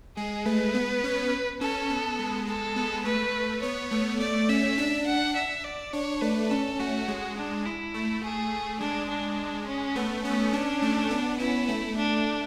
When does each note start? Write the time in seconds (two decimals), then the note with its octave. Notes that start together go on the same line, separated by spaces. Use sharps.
0.17 G#3 G#4
0.46 A3 B4
0.74 B3
1.04 C#4
1.61 C#4 A4
1.90 B3
2.19 G#3
2.47 G#3 A4
2.76 B3
3.05 A3 B4
3.62 B3 C#5
3.91 A3
4.20 A3 D5
4.49 C#4 E5
4.78 D4
5.06 F#5
5.35 E5
5.64 D5
5.93 D4 C#5
6.21 A3 B4
6.50 C#4 A4
6.79 A3 F#4
7.08 G#3
7.37 D4
7.65 E4
7.94 A3
8.23 G#4
8.80 G#3 D4
9.09 D4
9.67 C#4
9.96 A3 B3
10.24 B3 C#4
10.53 C#4 D4
10.82 A3
11.11 B3
11.40 C#4 E4
11.68 A3
11.97 A3 D4